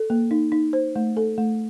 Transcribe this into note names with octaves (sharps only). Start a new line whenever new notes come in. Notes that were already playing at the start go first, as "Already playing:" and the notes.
Already playing: A4
A#3
D#4
D#4
C5
A3
A4
A3